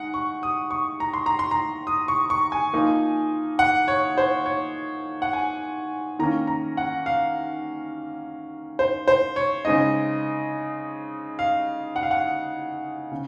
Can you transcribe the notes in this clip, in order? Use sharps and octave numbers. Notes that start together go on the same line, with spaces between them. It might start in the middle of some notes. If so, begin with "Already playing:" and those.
Already playing: G#3 D#4 F#5
C#6
D#6
C#6
A#5
C6
A#5
C6
A#5
D#6
C#6
C#6
G#5
F3 A#3 D#4
F#5
C#5
C5
C#5
F#5
G#5
D#3 A#3 C#4 A#5
A#5
F#5
F5
C5
C5
C#5
C#3 G#3 C4 D#4 D#5
F5
F#5
F5
F#5
C#3